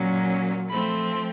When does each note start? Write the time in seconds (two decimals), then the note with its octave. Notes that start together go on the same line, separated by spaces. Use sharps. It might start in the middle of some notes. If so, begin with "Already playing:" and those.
Already playing: A#2 F#3 A#3 C#4
0.69 F3 A3 C4 B5